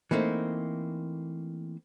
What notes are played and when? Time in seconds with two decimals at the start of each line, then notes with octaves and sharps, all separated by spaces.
0.11 E3 A3 A#3 C4 D#4